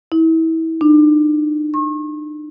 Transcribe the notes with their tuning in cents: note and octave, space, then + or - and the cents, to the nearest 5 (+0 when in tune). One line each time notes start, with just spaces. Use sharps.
E4 -30
D4 +45
C#6 -45